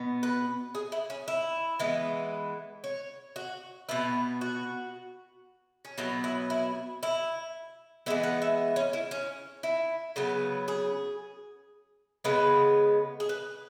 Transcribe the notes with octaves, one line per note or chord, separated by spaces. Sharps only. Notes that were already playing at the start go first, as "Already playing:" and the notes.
Already playing: B2 B3
B4
G#4
E4
C#4
E4
E3 G#3 B3
C#5
F#4
B2 B3 E4
F#4
C#4
B2 F#3 B3 E4
E4
E4
E4
E3 G#3 B3 E4
F#5
E5
C#4
E4
C#4
E4
C#3 F#3 B3
G#4
C#3 G#3 B3 B4
G#4
B4